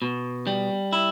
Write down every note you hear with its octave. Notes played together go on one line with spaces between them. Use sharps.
B2
G3
E4